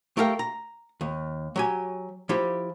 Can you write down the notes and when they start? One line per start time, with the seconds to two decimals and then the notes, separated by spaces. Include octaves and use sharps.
0.17 A3 G4 A4 A#4 F5 G5
0.39 A#5
1.01 D#2
1.56 F#3 G4 G#5
2.29 F3 E4 G4